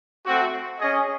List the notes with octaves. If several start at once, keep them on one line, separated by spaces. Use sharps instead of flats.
A3 C4 F#4
C#4 G#4 D#5